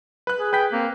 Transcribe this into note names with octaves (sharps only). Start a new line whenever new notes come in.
B4 F#6
G#4
B4 G5 B6
A#3 C4